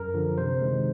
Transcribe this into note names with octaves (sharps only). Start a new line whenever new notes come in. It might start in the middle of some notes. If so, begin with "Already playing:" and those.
Already playing: F#2 A#4
D3 F3
C3 C5
D#3 G#3